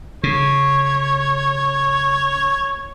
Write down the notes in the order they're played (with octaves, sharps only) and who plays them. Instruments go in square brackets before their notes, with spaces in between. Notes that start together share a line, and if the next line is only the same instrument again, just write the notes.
[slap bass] C#3 [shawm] C#5